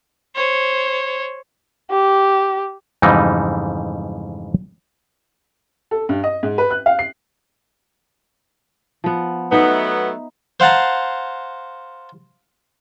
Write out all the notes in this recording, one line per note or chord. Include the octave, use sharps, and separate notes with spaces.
C5 C#5
G4
F2 G#2 C#3 E3 G3 D#4
A4
G2
D#5
G#2
B4
F#6
F5
C7
F3 B3
F#3 A3 B3 D#4 E5
C5 F5 F#5 A5 A#5